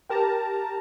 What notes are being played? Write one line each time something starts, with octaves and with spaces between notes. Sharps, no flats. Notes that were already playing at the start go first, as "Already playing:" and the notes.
G4 A#4 A5 A#5